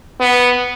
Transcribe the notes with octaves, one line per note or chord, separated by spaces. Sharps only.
B3